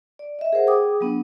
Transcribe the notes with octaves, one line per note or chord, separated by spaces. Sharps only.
D5
D#5 E5
G#4 A#4 C5 F#5
G#4 G5 D6 D#6
F#3 B3 D4